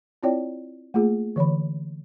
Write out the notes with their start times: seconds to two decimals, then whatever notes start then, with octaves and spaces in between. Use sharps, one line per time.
0.23 C4 E4 F4 C#5 D5 G5
0.94 A3 A#3 F4 G#4
1.36 D3 E3 C#5 B5